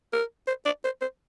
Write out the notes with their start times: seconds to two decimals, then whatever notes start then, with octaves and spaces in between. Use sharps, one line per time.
0.13 A#4
0.48 C5
0.66 D5
0.85 C5
1.02 C5